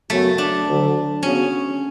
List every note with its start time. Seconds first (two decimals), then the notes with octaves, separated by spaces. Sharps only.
0.09 F#2 C#3 F#3 A3 B3 F#4
0.38 D4
0.66 D2 D3 F#3
1.23 C#3 F#3 B3 C#4 F#4